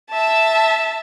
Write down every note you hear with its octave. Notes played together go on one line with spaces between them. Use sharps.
E5 A5